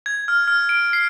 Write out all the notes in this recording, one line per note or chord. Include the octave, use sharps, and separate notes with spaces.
G#6
F6
F6
D7
C7